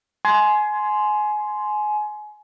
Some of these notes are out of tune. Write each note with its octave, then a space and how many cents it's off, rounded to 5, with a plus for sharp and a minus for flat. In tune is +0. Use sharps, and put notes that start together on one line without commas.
G#5 +25 C6 -5